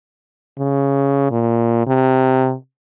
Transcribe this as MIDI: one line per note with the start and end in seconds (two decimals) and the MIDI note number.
0.59 1.27 49
1.31 1.84 46
1.87 2.55 48